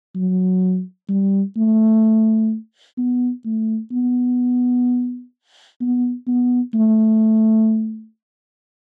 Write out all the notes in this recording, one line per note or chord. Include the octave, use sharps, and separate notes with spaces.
F#3
G3
A3
B3
A3
B3
B3
B3
A3